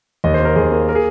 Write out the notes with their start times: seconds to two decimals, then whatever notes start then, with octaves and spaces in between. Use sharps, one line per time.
0.24 D#2 D#5
0.34 C5
0.40 A#3
0.45 A#4
0.56 D#2 G#4
0.71 A#3
0.89 A#4
0.95 G#4